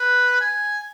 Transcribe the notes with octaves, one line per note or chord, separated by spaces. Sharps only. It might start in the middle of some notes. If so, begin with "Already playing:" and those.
Already playing: B4
G#5